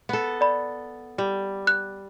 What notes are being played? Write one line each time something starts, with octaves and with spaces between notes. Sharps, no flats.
B3 A4
D5 B5
G3
F#6